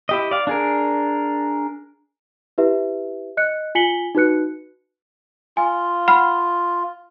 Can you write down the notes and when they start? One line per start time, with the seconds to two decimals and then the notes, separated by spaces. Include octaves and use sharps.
0.09 E4 G4 D#5
0.31 D5 F5
0.47 D4 G#4 A#4
2.58 E4 G4 B4 E5
3.37 D#5 F#6 C#7
3.75 F4 G#5 B6 C#7 F#7 G7
4.15 D#4 F#4 B4 F#6 C#7
5.57 F4 G#5
6.08 F#5 B5 F6